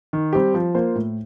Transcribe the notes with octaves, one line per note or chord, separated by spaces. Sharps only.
D#3
G3 C4 G4
F3
A#3 F4 C5
A2